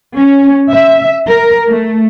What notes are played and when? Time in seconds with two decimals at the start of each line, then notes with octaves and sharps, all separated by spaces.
0.17 C#4
0.72 E5
1.28 A#4
1.70 A3